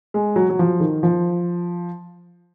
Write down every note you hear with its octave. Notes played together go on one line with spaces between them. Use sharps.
G#3
F#3
F#3
F3
D#3
F3